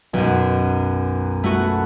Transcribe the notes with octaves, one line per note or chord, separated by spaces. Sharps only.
B1 F#2
A3 B3 F#4